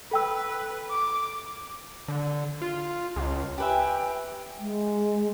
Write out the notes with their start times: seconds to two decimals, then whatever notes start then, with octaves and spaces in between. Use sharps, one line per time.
0.11 A4 B4 G5 E6
0.90 D6
2.08 D3
2.62 F4
3.16 C#2
3.58 G4 B4 E5 G5 G#5
4.59 G#3